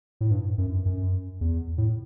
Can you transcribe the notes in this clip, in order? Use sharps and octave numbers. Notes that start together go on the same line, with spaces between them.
A2
G2
F#2
F#2
E2
A2